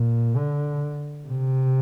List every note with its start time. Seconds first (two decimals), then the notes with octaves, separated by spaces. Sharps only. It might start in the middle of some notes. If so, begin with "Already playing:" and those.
Already playing: A#2
0.36 D3
1.27 C3